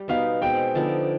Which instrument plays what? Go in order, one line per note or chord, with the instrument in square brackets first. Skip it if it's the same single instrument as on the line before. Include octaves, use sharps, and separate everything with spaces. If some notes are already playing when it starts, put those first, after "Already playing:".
Already playing: [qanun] G3
[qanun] B2 B3 D#4 B4 [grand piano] F5
[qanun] B2 G#3 C4 [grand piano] G5
[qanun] D3 F3 B3 D#4